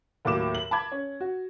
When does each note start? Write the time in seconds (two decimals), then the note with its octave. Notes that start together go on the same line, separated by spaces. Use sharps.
0.25 D#2 A2 F#3 D6 E7
0.55 F#7
0.71 A5 B5 D6 G#6
0.92 C#4
1.21 F#4